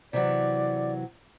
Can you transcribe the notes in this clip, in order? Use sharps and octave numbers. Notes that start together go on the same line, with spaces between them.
C3 E3 F#3 D5